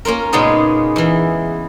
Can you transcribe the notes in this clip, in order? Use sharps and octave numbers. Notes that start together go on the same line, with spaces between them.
A#3 C#4 F4 A#4
A#2 C#3 G#3 B3 D#4
E2 E3